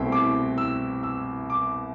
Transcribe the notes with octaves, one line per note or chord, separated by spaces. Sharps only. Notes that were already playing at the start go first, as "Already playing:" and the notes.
Already playing: C2 B2 A3 C4 E4 G5
D6
E6
E6
D6